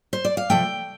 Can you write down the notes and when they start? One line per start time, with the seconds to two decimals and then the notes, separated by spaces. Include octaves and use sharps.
0.13 C5
0.25 D5
0.37 F5
0.50 C3 F3 A3 G5